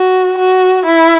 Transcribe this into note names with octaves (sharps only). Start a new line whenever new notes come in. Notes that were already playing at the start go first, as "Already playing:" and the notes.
Already playing: F#4
F#4
E4